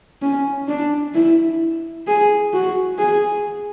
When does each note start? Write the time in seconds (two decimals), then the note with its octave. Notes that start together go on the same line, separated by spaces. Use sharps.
0.22 C#4
0.68 D4
1.14 E4
2.07 G#4
2.53 F#4
2.99 G#4